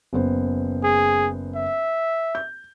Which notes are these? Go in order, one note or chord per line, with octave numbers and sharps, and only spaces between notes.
F#1 B3 C5
G#4
E5
G6